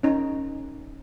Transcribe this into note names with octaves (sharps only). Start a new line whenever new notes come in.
C#4 D#4